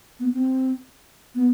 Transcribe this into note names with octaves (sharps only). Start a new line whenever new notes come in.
B3
C4
B3